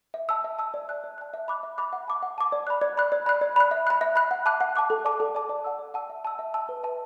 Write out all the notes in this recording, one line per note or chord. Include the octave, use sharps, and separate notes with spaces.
E5
A5 E6
E5
A5 E6
D5
A5 F#6
D5
A5 F#6
E5
B5 D6 F#6
E5
B5 D6 F#6
F#5
A5 D6
F#5
A5 D6
D5
B5 F#6
D5
B5 F#6
D5
B5 F#6
D5
B5 F#6
E5
B5 F#6
E5
B5 F#6
F#5
A5 D6 F#6
F#5
A5 D6 F#6
A4
D5 A5 D6
A4
D5 A5 D6
D5
F#5 A5 E6
D5
F#5 A5 E6
E5
A5 E6
E5
A5 E6
B4
E5 A5